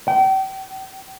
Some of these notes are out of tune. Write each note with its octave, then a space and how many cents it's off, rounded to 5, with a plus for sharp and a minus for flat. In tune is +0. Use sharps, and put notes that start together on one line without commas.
G5 -35